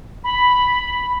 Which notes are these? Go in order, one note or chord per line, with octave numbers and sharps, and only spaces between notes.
B5